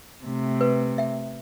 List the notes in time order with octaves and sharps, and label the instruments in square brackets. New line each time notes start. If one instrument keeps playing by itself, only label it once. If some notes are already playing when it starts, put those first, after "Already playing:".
[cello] C3 A3
[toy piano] B4
E5 G5